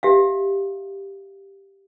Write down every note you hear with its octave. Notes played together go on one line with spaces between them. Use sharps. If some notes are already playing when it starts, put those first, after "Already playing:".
G4 E5 F5